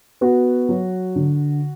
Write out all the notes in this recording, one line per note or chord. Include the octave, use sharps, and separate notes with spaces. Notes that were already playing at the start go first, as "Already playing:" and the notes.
B3 F#4
F#3
D3